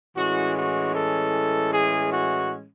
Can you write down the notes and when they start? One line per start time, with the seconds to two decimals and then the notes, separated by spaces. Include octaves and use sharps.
0.15 A2 E3 G#3 C#4 F#4
0.55 F#4
0.94 A4
1.72 G#4
2.11 F#4